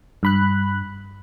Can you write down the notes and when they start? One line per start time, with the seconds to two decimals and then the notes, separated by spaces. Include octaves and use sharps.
0.23 G2 B5 F#6